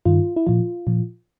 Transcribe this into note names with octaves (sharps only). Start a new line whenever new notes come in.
G2 D#3 F4
E4
A#2 F3 F4
A#2 F3